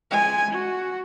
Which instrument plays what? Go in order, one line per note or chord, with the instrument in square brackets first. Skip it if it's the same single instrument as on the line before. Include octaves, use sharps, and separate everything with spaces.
[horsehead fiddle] G#3 G#5
F#4